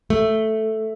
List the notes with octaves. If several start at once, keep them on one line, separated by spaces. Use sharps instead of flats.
A3